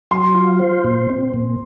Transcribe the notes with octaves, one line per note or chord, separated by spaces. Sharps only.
F#3 C6
F4
C5
A#2
C4
A#2